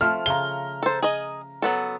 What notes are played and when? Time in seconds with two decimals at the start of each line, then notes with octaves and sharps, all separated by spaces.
0.01 F3 A3 C4 F6
0.26 C#3 F4 A#5 G7
0.83 A4 C5
1.02 G#4 D#5
1.62 F#3 B3 A4